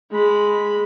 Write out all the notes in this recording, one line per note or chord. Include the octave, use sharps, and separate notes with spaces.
G#3 B5